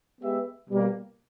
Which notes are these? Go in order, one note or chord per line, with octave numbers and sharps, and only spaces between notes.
G#3 B3 G4 B4 E5
B2 G3 A#3